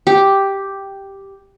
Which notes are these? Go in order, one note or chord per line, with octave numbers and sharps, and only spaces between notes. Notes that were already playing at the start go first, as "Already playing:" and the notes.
G4